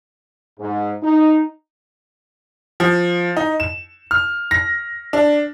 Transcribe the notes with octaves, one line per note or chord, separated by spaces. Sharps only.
G#2
D#4
F3
D#4
E7
F6
A#6
D4